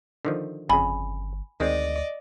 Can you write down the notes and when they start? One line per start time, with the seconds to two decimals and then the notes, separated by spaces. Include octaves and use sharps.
0.25 D3 D#3 F3
0.69 G1 F2 C#3 G#5 B5
1.60 D2 D#3 G#3 C4 D5 D#5